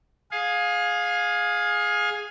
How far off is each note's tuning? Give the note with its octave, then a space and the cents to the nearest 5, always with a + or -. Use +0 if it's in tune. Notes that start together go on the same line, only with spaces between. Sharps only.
G#4 +0 F5 +25